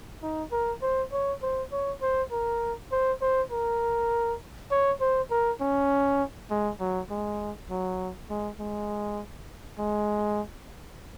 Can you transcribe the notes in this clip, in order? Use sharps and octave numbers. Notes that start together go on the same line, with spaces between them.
D#4
A#4
C5
C#5
C5
C#5
C5
A#4
C5
C5
A#4
C#5
C5
A#4
C#4
G#3
F#3
G#3
F#3
G#3
G#3
G#3